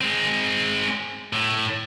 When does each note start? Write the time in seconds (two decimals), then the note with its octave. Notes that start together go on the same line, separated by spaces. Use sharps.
0.01 G#3 C4
1.33 A2